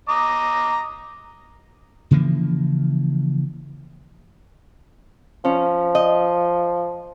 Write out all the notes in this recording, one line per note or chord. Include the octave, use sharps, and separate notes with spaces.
D#5 A#5 D6
C#3 E3 F3 A#3
F3 C#4
D#5